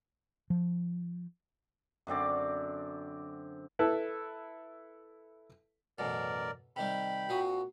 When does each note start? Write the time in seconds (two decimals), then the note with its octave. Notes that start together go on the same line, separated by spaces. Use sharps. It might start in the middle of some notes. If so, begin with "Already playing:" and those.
0.50 F3
2.07 F#2 D3 C4 D5
3.79 E4 A4 B4
5.99 A1 F#2 B2 A#4 D5
6.76 C3 D#3 G3 G5 B5
7.29 A#2 C4 F#4 D#6